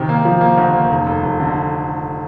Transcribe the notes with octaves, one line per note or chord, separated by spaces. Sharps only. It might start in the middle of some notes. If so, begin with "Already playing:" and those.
Already playing: C3 D#3
A#3
F3
A#3
D2
A#3
F1
F1
F1
D3